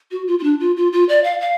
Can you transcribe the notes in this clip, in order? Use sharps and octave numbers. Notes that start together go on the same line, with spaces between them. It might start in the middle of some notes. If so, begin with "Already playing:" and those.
F#4
F4
F4
D4
F4
F4
F4
D5
F5
F5